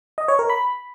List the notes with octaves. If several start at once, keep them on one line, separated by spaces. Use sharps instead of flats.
D#5
C#5
A#4
B5